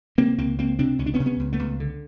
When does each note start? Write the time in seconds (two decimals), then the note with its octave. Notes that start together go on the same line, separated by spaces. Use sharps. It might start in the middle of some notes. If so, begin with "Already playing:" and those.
0.18 C3 A#3 C4
0.38 C#2 A#3 C4
0.58 C#2 A#3 C4
0.79 C3 C4 D4
0.99 C#2 C#4
1.06 D4
1.14 B3 C#4
1.20 C3
1.26 B3 C#4
1.39 C#2
1.53 A3 B3
1.59 C#2
1.80 D3